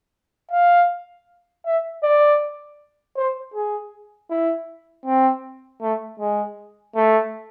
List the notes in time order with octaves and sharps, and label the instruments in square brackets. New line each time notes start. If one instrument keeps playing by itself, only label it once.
[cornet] F5
E5
D5
C5
G#4
E4
C4
A3
G#3
A3